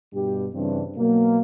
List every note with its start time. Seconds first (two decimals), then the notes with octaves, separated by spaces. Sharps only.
0.14 G2 B2 G3 G4
0.54 G2 C#3 E3 C4 D4
0.97 B2 F#3 A#3